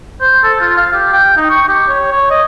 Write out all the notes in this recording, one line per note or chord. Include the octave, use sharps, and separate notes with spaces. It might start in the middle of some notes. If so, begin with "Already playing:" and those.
C5
A4
F4
F5
G4
G5
D#4
C#6
G4
C#5
C#5
D#5